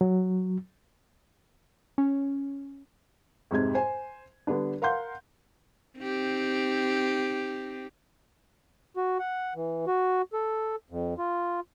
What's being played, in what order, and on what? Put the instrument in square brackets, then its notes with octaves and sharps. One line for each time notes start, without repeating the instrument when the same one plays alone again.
[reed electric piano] F#3
[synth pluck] C#4
[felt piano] F2 G#2 C3 G#6
C5 G#5
D3 G3 B3 D4
A#4 F5 F#5 C6 G6
[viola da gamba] C4 D#4 G4
[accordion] F#4
F#5
E3
F#4
A4
F2
F4